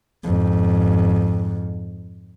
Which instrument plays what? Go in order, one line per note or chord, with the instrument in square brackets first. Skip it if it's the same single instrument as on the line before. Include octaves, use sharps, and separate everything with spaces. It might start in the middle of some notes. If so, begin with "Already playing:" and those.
[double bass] F2 G#2